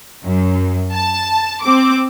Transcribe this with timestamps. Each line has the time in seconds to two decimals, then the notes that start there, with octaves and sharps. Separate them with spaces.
0.24 F#2
0.92 A5
1.64 C4 D6